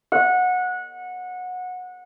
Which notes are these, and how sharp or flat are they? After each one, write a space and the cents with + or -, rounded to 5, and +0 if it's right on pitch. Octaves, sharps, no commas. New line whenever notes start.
F#5 -20